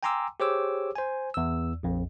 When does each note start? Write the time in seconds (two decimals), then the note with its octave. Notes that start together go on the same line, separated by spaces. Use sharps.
0.03 G5 G#5 A#5 C6 D6 E6
0.40 G4 G#4 C5 C#5 D6 E6
0.96 C5 G#5
1.34 E2 E6
1.83 A#1 F2